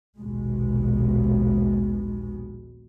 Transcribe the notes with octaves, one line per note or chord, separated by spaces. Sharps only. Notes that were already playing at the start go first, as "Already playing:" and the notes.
A#1 D#2 B2 G#3